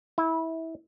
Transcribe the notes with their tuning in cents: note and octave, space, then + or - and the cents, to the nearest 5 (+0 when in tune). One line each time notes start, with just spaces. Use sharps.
E4 -20